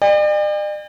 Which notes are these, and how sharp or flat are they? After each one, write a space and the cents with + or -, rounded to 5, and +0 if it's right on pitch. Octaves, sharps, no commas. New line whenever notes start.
D5 +45 G5 +45